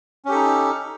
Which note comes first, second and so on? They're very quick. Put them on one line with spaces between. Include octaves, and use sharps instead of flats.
C#4 G4 A4 D#4